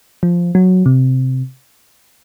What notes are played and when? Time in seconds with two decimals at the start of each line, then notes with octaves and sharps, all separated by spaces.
0.23 F3
0.55 F#3
0.86 C3